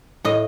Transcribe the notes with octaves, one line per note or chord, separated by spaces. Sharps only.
A2 D#5